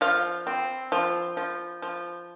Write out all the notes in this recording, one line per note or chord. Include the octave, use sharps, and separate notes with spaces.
F3 F5
C4
F3
F3
F3